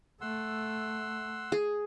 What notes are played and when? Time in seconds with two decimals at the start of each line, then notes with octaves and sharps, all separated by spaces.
0.21 A3 F#5 C6 E6
1.52 G#4